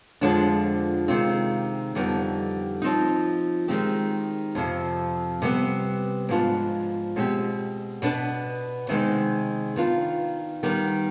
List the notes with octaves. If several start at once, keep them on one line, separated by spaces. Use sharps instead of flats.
F2 D3 F3 G#3 D4
C3 D#3 G#3 C4 F4
F2 D3 G3 B3 D#4
F3 C4 D#4
D#3 G#3 C4 G4
F2 C3 F3
C3 G3 B3
G#2 F3 B3 D4 F4
B2 G#3 C4 G4
B2 B3 D4
C3 D#3 G#3 B3 D#4
D#3 B3 D4 F4
D#3 G3 B3